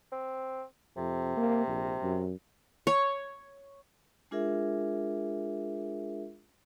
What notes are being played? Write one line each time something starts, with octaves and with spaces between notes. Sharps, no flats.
C4
F2 C3
A#3
A#1
F#2
C#5
G#3 D4 F4 G#4 A#4 E5